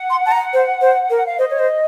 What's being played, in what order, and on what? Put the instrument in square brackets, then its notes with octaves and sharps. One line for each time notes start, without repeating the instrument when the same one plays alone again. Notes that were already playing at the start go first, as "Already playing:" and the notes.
Already playing: [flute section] F#5
[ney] C6
A5
A#5
C5
C5
A#4
[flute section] F#5
F5
[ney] C5 [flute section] D#5
[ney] C#5
C5